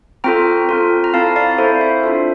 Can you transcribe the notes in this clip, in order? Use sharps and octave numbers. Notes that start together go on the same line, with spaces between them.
C4 F4 A4 G5 A#5
C4 F4 A4
A#5
C4 E4 A4 F5 A5
D5 F5
F5
C4 E4 A4 C5 E5
F5
C5 E5
D4 F4 A4